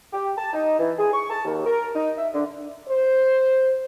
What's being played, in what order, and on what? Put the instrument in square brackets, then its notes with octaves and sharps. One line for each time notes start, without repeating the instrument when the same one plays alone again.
[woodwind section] G4
A5
D#4
E3
G#4
C#6
A5
D#2
A#4
D#4
E5
D3
[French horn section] C5